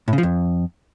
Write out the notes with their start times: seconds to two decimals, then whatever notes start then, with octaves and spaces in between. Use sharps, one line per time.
0.08 A2
0.13 C#3
0.18 F3
0.23 F2